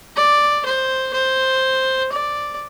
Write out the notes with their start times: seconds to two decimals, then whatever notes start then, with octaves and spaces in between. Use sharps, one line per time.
0.16 D5
0.65 C5
1.14 C5
2.12 D5